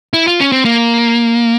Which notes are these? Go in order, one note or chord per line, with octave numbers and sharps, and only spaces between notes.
E4
F4
C#4
C4
A#3